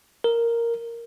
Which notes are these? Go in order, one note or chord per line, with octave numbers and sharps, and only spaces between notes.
A#4